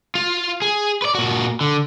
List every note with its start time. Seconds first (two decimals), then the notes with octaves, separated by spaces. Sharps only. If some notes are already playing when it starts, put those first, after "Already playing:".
0.15 F4
0.62 G#4
1.02 B4 D5
1.15 A#2 F#4
1.61 D3